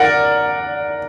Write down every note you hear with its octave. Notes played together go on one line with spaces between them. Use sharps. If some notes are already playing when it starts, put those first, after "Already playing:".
Already playing: A#4 D5 F#5